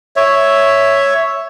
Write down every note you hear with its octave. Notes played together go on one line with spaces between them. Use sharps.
C#5 E5